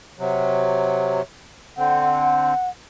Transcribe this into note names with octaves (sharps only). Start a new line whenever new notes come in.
C3 F#3
D3 C4 F#5